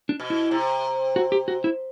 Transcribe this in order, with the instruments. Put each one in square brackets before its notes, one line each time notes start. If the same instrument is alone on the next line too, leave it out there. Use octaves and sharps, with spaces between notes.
[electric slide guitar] D4
[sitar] B2
[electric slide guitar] E4
[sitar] C3
[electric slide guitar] F#4
G4
F#4
E4